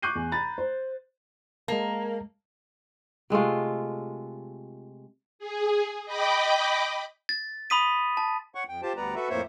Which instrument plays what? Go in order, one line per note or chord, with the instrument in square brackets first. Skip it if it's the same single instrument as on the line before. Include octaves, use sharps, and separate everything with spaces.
[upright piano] C#6 D6 F#6 G6 C7 D#7
E2
A#5 B5 A6
C5
[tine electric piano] G#3 A#4 A5 [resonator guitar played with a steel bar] A#3
[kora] C3 G#3 A3 F4
[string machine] G#4
D#5 G5 B5 D6
[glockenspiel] A6
B5 C6 D#6 B6 D#7
A5
[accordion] C#5 F#5 C#6
F2 G5
F4 G4 C5 A5
D2 G3 B3 B4 D5 A#5
F#4 A4 B4 E5
F2 A2 A#3 C5 C#5 E5